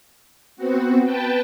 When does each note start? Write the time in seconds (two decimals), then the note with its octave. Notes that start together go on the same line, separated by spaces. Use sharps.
0.56 B3 C4 F#4
1.03 B4 G5 A5